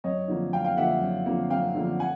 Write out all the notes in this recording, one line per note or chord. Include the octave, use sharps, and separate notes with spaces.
F#2 C#5 D#5
D3 F3 A#3
F#2 F5 G5
F5 G5
D3 F3 A#3 E5 F#5
F#2
D3 F3 A#3
F#2 F5 G5
D3 F3 A#3
F#5 G#5